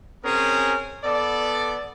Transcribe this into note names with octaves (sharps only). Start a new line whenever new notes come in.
C4 C#4 G#4 A#4
B3 A4 D5